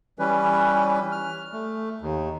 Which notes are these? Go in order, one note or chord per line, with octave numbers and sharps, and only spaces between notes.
E3 G3 C#4 B4
F6
A3
D#2